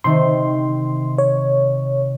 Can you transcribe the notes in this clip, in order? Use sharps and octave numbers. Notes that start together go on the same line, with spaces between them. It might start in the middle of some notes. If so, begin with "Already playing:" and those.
C3 D#3 C6
C#5